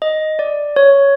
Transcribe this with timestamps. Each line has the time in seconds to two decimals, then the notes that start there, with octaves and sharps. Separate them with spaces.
0.02 D#5
0.39 D5
0.76 C#5